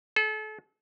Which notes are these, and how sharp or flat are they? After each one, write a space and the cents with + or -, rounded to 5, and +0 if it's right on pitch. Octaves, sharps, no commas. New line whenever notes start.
A4 -35